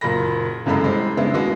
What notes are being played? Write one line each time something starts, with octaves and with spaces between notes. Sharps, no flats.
F#1 A#2 A#3 A#4 B5 A#6
C2 F#2 C#3 G#3 A4 B5
G3 G#3 C4
C#3 G#3 B3 D4 E4
D#2 G#3 B3 F#4 B4